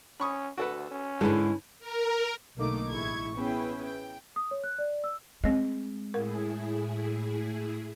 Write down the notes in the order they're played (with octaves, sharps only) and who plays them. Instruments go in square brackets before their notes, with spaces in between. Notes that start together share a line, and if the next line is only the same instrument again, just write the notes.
[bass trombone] C#4 [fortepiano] B5 C#6 D#6
[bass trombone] D2 [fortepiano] F#4 A4 B4
[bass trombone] C#4
[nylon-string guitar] G#2 G#3 [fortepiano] D3 B4 [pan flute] E4
[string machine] A#4
[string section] B1 D3 A3 A#3 D#4 D6
A1 G#3 E4 C#6 G#6
B3 C#4 E4 G#4 B4 G5
G5
[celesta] D#6
C#5
F#6
D5
E6
[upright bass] G#3 [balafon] C4 D#5
[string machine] A2 E4 G#4 [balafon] A#4